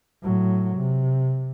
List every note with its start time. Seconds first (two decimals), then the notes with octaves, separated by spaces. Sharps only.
0.22 A2 F#3
0.76 C3